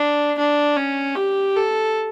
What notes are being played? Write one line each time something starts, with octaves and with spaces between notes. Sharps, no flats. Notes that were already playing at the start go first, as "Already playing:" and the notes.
Already playing: D4
D4
C#4
G4
A4